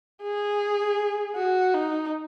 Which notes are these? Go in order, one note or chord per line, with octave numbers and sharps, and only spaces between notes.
G#4
F#4
D#4